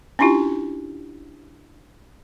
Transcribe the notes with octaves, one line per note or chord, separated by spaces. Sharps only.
C#4 D4 E4 F4 G4